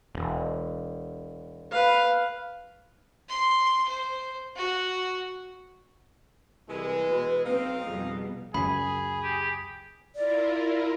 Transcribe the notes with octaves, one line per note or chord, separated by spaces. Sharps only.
E1
B4 F5
C6
C5
F#4
C2 E3 G#3 B4
B2
B1 C4 D#4 D#5 F5
F2 B2 G3 G#4
C#2 F#2 G#4 B5
G4
E4 F4 A#4 D5